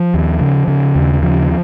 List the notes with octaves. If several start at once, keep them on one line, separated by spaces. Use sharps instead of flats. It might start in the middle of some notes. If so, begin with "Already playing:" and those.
Already playing: F3
D#2
C#3
C#3
D#2
C#3 F3